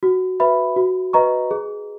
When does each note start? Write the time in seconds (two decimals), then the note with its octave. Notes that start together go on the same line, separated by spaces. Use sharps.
0.03 F#4
0.40 B4 E5 B5
0.76 F#4
1.13 B4 D#5 A#5 C#6
1.51 G#4